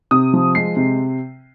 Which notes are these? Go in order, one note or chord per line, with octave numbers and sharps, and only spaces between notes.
C3 D#6
F3
G#3 C7
C3